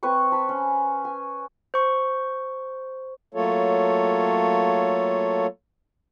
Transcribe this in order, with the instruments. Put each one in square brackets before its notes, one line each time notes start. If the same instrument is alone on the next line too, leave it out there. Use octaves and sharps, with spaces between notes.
[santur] C4 B4 C#5 C#6
A5 B5
C#4
G#5
[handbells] C5 C#6
[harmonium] F#3 A3 A#3 F4 A4 C#5